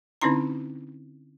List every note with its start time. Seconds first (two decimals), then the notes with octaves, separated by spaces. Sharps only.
0.22 D3 C4 C#4 D#4 E4 A#5